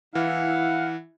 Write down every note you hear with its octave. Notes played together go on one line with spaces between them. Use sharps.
E3 E4 F5 F#5